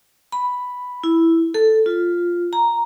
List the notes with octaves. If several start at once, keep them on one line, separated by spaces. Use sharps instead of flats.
B5
E4
A4
F4
A#5